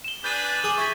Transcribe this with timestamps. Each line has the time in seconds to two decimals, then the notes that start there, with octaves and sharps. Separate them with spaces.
0.04 E7 G7
0.24 D4 G#4 B4 G6 A6 D#7
0.64 G#4 D6 F#7
0.77 E4 G#5 C#6 B6